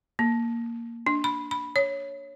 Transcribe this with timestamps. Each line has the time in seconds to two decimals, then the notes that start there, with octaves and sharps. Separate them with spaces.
0.19 A#3
1.07 D4
1.24 B5
1.51 B5
1.76 C#5